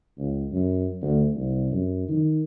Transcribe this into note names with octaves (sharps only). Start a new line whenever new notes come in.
C#2
F#2
D2
C2
F#2
D#3